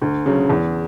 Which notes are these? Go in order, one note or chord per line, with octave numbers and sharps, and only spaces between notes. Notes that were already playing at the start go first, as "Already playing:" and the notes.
D2
C#3 F#3
E2